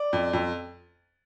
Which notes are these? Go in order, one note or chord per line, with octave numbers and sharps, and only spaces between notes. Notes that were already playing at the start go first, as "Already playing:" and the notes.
Already playing: D5
F2
F2